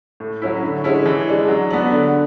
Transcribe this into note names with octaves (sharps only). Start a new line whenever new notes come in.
A2
F#3 C#4 E4
D3
G#3 C#4 E4
E3
G#3 D4
F#3
B3 D4
D3